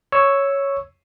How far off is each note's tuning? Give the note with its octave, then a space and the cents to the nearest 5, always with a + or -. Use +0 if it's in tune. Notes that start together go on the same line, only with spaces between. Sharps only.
C#5 +0 C#6 +0 E6 +0